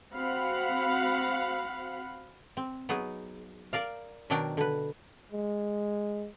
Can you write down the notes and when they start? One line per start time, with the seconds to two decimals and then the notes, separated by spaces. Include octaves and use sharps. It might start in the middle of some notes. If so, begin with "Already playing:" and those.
0.15 C4 F#4 F5 F#5 B5
2.57 C4
2.89 F#3 B3 D#4 G#4
3.73 A#4 D5 F5
4.30 B2 D#3 F#3 D4 A#4 G5
4.57 D3 B4
5.32 G#3